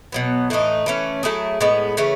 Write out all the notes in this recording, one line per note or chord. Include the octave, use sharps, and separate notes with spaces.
B2 F#3 B3
A2 E3 A3 D#4
E3 A3 C#4
F#3 A3 E4 G#4
A2 G#3 B3
C#3 E3 A3 C#4